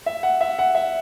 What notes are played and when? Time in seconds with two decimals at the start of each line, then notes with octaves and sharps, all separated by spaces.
0.06 E5
0.23 F#5
0.41 E5
0.59 F#5
0.75 E5